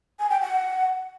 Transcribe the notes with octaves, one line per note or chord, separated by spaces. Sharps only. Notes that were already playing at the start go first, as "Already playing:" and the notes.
G#5
G5
F#5